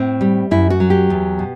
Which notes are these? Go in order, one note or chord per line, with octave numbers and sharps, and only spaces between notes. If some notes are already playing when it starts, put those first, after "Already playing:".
Already playing: A2 C4
G3
F#2 E4
F#4
F#3
G4
E2
B2